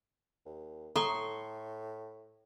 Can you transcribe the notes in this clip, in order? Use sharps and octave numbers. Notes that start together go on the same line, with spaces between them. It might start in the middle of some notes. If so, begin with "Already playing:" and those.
D#2
A2 A4 A#5 C6 C#6 D#6